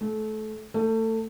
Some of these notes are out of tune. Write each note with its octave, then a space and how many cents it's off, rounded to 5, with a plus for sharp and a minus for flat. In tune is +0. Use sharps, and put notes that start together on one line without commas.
A3 -25
A3 +25